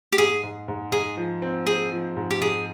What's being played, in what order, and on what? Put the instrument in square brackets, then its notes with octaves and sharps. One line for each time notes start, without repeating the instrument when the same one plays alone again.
[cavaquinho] G4
[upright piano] G#2 [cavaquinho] G#4
[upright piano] G#2
G#2
[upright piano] G#2 [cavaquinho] G#4
[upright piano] F3
C4
[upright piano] C4 [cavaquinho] G#4
[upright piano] F3
G#2
[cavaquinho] G4
[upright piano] G#2 [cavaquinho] G#4